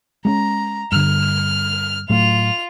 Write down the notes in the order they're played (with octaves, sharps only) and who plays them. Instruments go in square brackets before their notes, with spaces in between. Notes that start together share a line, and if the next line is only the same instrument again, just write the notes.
[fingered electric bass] G#3 A#3 C#4 [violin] A#5
[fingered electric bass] G2 D3 [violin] F6
[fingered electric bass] A2 F#3 A3 [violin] F4 F7